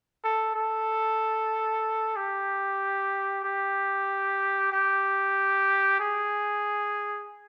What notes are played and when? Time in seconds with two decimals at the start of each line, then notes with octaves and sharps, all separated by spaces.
0.24 A4
0.55 A4
2.16 G4
3.45 G4
4.72 G4
6.00 G#4